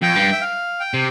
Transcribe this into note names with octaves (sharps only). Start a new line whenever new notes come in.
F2 G5
G2
E5
F5
G5
C3